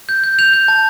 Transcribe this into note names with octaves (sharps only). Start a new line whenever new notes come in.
G6
G6
G6 F7
G6
A5